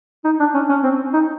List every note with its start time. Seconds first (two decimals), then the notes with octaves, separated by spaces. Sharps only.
0.25 D#4
0.40 D4
0.54 C#4
0.69 C#4
0.83 C4
1.13 D#4